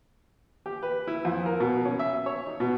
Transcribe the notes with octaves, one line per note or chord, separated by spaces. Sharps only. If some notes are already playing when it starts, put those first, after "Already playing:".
G4
B4
E4
F2
A#4
B2
C#4
E5
C#5
D#4
B2